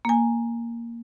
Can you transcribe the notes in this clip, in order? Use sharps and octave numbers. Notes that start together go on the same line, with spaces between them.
A#3 G#5